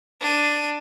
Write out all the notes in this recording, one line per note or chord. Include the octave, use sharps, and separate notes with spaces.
D4 D#7